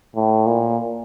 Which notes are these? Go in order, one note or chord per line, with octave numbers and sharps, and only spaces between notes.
A2
A#2